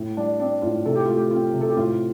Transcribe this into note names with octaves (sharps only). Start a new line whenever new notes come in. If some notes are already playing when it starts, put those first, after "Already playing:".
Already playing: A2
G3 D4
C4 D4
A2 F4
C3 A4
G4
A3 F4
G4
C4 F4
C3
A4
G4
A2 F4